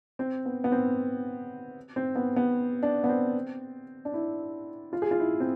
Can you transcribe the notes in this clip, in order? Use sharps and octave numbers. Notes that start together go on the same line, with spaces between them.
C4
B3
B3
C4
C4
B3
B3
D4
B3
C4
D4
E4
F4
G#4
F4
E4
C4